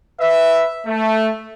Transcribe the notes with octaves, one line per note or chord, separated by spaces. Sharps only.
B4 E5
A3